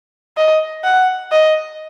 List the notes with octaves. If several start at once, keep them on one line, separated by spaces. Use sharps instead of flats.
D#5
F#5
D#5